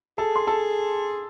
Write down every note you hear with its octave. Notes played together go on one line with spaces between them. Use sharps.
G#4 A4 A5
C6
A4 A5